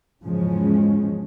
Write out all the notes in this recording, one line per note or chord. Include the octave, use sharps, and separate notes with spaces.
E2 G#2 C#3 F3 G#3 C#4